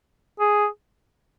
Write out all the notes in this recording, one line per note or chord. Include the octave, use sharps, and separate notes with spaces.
G#4